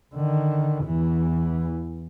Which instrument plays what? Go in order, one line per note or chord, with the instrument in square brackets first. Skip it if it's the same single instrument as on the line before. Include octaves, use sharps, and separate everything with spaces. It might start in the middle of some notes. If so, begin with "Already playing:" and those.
[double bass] D3 D#3
E2 E3